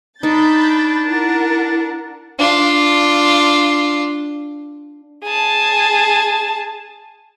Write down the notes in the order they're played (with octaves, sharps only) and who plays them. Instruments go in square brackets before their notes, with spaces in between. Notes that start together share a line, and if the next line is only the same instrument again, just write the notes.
[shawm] D4 [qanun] D#4 [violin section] B5 G6 A6
[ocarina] E4 [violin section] A#4 F#5
[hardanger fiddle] D4 F4
[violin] G#4 A5